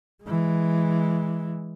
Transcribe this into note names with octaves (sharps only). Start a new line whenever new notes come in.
E3 G#3